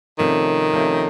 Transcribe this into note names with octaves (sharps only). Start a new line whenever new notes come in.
C2 C3 D#3 F3 A3 C#4
C2 C3 F3 A3 C#4